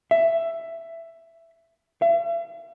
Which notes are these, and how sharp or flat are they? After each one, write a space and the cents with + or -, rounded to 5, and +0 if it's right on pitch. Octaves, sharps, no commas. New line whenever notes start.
E5 +10
E5 +45